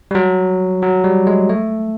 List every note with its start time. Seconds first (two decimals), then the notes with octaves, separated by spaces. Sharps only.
0.11 G3
0.15 F#3
0.82 F#3
1.04 G3
1.27 G#3
1.49 A3